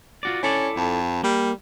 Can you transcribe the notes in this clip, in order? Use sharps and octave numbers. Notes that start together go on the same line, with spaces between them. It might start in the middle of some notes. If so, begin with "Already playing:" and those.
F4 F#4 D5
C#4 E4 A4 D5
F2
G3 A#3